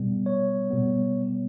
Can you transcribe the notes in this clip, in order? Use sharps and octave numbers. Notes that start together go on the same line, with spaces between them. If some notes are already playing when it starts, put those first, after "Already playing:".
Already playing: B2 G3 B3
C#5
B2 G3 B3